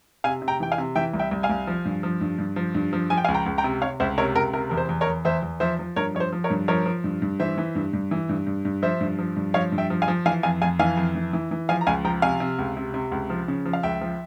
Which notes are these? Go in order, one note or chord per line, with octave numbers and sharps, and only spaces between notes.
C3 F5 G#5
C3
G5 A#5
E3 G5
F5 G#5
C3
E3 E5 G5
C2
E5 G5
C2
F5 G#5
C2
F3
G2
F3
G2
G2
F3
G2
F3
F3 G#5
G5
F5 G#5
C#2
G5 A#5
C#2
G5 A#5
C3
C3 C#5 F5
C#2 C5 E5
C3 A#4 C#5
C#2 A#4
C3 A#4
E2 A#4
C5
E2
A#4 C#5
E2
E2 C5 E5
E2
F3 C5 E5
F3
G2 A#4 C#5
F3 C#5
C5
F3
A#4 C#5
G2
F3 A#4 C#5
F3
G2
G2
E3 C5 E5
E3
G2
G2
E3
G2
G2
G2
F3 C5 E5
G2
F3
G2
F3 C#5 F5
G2
E5 G5
F3
F5 G#5
F3
E3 F5 G#5
F2 F5 G#5
F2 F5 G#5
E3 F5 G#5
F2
E3
E3
E3
F3 F5 G#5
A#5
C#2 F5 G#5
F3 G5 A#5
C3 F5 G#5
C3
C#2
C3
C3
C#2
F3
C#3
F3
F5
C#2 E5 G5
F3